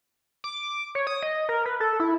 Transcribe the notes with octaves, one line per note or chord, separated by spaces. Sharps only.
D6
C#5
D#6
D#5
A#4
B4
A4
E4